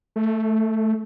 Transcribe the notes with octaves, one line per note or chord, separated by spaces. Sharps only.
A3